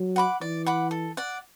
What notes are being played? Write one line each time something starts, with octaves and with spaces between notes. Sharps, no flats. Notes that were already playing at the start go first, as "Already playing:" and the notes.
Already playing: F#3
F#5 B5 D6
E3 D5
F#5 B5 D6
A4
D5 F#5